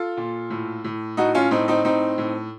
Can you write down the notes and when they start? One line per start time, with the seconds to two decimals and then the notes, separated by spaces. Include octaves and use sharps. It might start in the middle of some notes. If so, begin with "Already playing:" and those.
Already playing: F4 A4
0.17 A#2
0.50 A2
0.84 A2
1.17 A2 D#4 F#4
1.35 C#4 F4
1.51 A2 C4 D#4
1.68 C4 D#4
1.85 A2 C4 D#4
2.18 A2